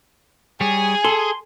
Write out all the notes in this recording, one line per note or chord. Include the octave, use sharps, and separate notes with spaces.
G3 G#4 C#5 G#5
A4 C6